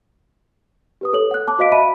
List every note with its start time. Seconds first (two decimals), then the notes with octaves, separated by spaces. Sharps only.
1.01 G4 B4 D#6
1.13 A4 C#5 F#7
1.31 F#5 F#6
1.47 A5 D6 F#6
1.59 F#4 C5 D#5 F5 B6 D7
1.72 E5 A5 B5 D#7